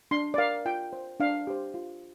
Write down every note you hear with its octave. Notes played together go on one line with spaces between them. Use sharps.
D4 C6
D5
A#4 F5
F4 G5
C5
D4 F5
G4 C5
F4